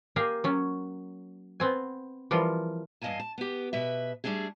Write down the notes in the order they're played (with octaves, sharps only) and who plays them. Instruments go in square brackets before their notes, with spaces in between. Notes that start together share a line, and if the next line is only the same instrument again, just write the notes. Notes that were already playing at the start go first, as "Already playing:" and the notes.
[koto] A#3 G4 G#4 D#5 F5
F#3 C#4
B3 C4 G#5
E3 F3 G3 F4 A#4
[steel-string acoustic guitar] E2 G2 D#5 F5 G#5 A5
A5
B3 G4
B2 B4 E5
G3 A3 D4 D#4 G#4